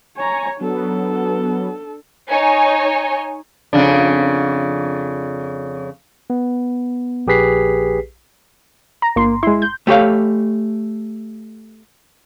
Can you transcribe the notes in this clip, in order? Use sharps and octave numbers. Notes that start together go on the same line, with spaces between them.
C#5 G#5 A#5 C#6
F#3 B3 D4 A4
D#4 C#5 G#5
F2 C#3 D4
B3
A#1 G4 G#4 B4 B6 C7
A#5
G1 A#3 C6
G#3 E4 C6
G6
A3 G4 C#5 F5